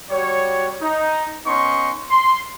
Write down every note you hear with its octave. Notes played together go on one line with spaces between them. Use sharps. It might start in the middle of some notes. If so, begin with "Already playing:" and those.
G3 F#4 C#5
D#4
B3 C#4 D#4 C6 C#6
C6